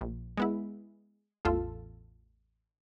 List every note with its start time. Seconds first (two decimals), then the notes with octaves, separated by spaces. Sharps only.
0.01 A#1
0.37 G#3 B3 E4
1.45 A1 E2 F4 A4